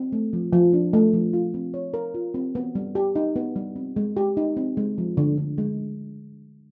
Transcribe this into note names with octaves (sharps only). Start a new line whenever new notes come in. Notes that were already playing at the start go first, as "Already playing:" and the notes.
Already playing: C4
A3
F3
F3
D4
A3
F3
F4
C4
C#5
A#4
F4
C4
B3
G3
G4
D#4
B3
G3
C4
G#3
G4
D#4
C4
G#3
F3
D3
D3
G#3